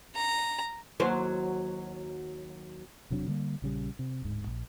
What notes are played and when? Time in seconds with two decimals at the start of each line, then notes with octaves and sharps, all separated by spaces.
0.15 A#5
1.00 D#2 F#3 C5
3.10 E1 C3 F#3 D4
3.27 D3 G3 A#3
3.62 A#1 C#3 G3
3.99 C3
4.22 D1 G#2
4.47 A#1